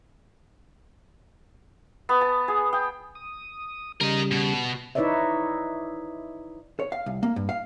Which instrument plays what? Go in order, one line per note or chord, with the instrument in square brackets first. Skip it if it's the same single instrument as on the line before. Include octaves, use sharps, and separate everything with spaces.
[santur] B3
A5
G#4
G5
[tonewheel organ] D#6
[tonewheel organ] C#3 G3 [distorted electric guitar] A#4 D#5
[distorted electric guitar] B2
[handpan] D#4 E4 B4 C#5 D5 E5
[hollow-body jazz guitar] C#5
F5
C2
A#3
G2
F5